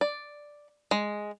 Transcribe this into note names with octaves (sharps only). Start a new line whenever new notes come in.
D5
G#3